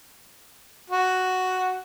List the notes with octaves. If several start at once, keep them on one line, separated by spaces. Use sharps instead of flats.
F#4